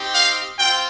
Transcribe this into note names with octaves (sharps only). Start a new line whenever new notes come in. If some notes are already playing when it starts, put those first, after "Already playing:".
Already playing: C4 D#4 G4
F5
C4 F4 G5